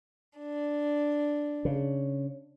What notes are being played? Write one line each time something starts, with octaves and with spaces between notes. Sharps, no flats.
D4
C#3